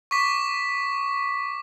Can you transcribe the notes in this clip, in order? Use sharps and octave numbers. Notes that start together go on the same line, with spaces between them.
C#6 D6 B6